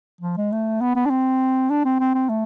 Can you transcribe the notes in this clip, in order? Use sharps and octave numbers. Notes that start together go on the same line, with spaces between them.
F3
G#3
A3
B3
B3
D4
C4
D4
C4
C4
C4
A3